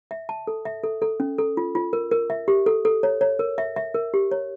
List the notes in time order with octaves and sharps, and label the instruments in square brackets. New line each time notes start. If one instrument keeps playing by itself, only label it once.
[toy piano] E5
A5
A4
E5
A4
A4
C#4
A4
F4
F4
A#4
A#4
E5
G4
A4
A4
C#5
C#5
A#4
E5
E5
A#4
G4
C#5